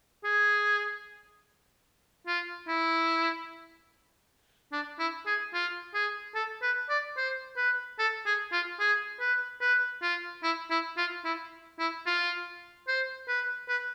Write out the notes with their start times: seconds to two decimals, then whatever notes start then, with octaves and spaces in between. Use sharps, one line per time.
0.24 G#4
2.27 F4
2.68 E4
4.72 D4
4.99 E4
5.26 G#4
5.54 F4
5.94 G#4
6.35 A4
6.63 B4
6.90 D5
7.17 C5
7.57 B4
7.99 A4
8.26 G#4
8.52 F4
8.80 G#4
9.20 B4
9.62 B4
10.02 F4
10.43 E4
10.70 E4
10.97 F4
11.25 E4
11.79 E4
12.06 F4
12.88 C5
13.28 B4
13.69 B4